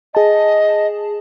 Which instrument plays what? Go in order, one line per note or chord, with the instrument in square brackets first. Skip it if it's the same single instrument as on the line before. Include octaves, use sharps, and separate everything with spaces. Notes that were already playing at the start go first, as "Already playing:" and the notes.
[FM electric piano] G#4 A5 [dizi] D#5